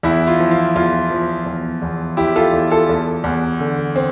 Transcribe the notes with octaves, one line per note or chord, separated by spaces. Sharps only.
E2 E4
F4
F3
F4
E2 F4
F3
E2
E2
E2 E4 G4
F4 A4
E2
F4 A4
E2
E2
D3
C4